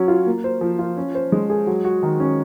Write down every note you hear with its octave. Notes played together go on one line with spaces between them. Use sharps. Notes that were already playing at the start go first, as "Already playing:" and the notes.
Already playing: F#3 C#4
F4
A#3
C5
F3
F4
C#4
C5
G#3
G#4
F#3
F#4
D#3
C#4